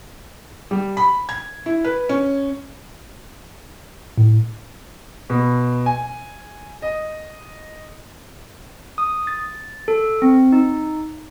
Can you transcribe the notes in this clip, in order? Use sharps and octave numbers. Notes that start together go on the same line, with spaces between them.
G3
B5
G#6
E4
B4
C#4
A2
B2
G#5
D#5
D#6
A6
A4
C4
D#4